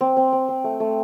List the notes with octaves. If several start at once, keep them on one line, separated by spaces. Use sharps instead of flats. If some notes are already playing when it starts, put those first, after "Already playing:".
C4
C4
C4
C4
A3
A3